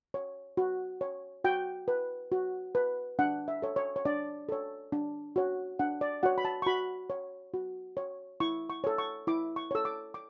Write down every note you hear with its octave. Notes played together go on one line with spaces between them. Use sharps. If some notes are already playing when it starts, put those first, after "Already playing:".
C#5
F#4
C#5
F#4 G5
B4
F#4
B4
D4 F#5
E5
A4 C#5
C#5
C#5
D4 D5
A4 C#5
D4
F#4 C#5
D4 F#5
D5
F#4 C#5 F#5
B5
A5
C#6
F#4 B5
C#5
F#4
C#5
E4 C#6
C#6
A4 C#5
C#6
E4 D6
C#6
A4 C#5 E6
D6
D6